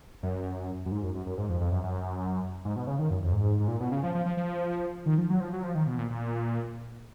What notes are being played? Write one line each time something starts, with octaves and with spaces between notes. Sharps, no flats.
F#2
F#2
G#2
F#2
F#2
F#2
G#2
F2
F2
F#2
F#2
G#2
B2
C#3
D#3
F#2
F2
G#2
G#2
A#2
B2
C#3
F3
F3
F3
F3
D#3
F3
F#3
F3
F#3
F3
D#3
B2
A#2
A#2